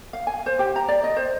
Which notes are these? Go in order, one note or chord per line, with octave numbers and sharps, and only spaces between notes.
F5
G#5
C5
G4
A#5
D5
D#5
C5